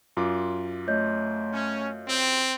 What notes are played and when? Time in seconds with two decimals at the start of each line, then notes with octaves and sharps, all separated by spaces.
0.17 F#2 F4 D6
0.88 A3 C#5 D#5 G6
1.53 C#4
2.08 C4